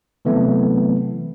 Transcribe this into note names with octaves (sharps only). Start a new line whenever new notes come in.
C3 E3 F#3 A3 B3 C4